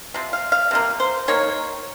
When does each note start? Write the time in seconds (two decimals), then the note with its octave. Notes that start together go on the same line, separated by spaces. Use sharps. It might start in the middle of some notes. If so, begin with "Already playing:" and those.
0.14 C3 F3
0.33 F5
0.52 F5
0.71 C3 F3 A#3
1.00 C5
1.28 D#3 A#3 C#5